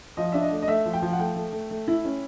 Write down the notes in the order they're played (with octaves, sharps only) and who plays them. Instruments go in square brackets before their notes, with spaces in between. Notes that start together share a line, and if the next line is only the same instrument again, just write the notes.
[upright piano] F3 D#5
D4 E5
D#5
A3
D#5
A3 E5
F3
G5
F3
F#5
A3 G5
A3
A3
A3
E4
C#4